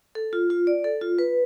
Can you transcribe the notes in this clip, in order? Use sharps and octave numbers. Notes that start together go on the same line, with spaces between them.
A4
F4
F4
D5
A4
F4
B4